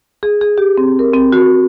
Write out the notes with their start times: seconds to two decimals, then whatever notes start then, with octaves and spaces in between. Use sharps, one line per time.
0.23 G#4
0.41 G#4
0.58 G4
0.78 C4
0.99 A#4
1.14 C4
1.32 F#4